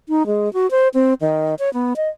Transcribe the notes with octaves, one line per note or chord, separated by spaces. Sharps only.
D#4
G#3
F#4
C5
C4
D#3
C#5
B3
D#5